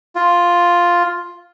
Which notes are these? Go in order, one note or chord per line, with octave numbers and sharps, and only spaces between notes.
F4